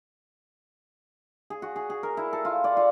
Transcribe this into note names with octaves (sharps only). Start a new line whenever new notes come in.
G#4
F#4
G#4
G#4
A#4
E4
A4
F4
D5
F4